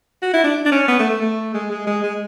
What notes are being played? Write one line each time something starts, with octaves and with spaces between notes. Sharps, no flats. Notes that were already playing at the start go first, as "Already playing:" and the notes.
F#4
E4
D4
D4
C#4
B3
A3
A3
A3
G#3
G#3
G#3
G#3